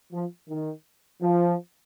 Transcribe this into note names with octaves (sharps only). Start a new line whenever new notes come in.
F3
D#3
F3